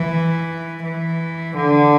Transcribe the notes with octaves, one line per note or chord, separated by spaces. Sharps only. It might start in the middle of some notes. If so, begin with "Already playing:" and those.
Already playing: E3
E3
D3